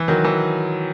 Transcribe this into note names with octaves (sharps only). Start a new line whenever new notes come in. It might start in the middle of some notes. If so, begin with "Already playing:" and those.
Already playing: E3
D#3 F#3
E3